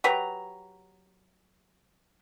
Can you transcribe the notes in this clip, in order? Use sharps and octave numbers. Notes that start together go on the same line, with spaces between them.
F#3 G4 B4 A#5